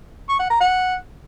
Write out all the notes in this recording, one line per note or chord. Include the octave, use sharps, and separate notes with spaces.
C#6
F#5
A#5
F#5